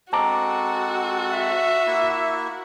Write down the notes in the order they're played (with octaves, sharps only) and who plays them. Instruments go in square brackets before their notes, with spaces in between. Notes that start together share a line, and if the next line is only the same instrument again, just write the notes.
[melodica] G#3 C4 A4 [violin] F#4 [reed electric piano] A5 A#5 D6
[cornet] E5
[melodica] A#3 E4